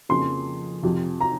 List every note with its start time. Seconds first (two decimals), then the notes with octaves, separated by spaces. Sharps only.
0.09 F2 C#3 F3 A#3 C6
0.83 F2 C3 F3
1.21 A#5